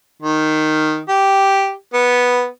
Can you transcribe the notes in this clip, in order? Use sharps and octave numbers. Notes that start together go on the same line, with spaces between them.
D#3
G4
B3